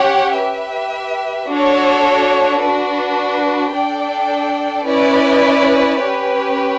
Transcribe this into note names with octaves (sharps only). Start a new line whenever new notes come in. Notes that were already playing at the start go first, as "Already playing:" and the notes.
Already playing: C#4 G4 C#5 F#5
G4 B4 E5
D4 F#4 A4 C#5
D4 F#4 B4
D4 A4 D5 G5
C#4 E4 B4 D5
C#4 G4 B4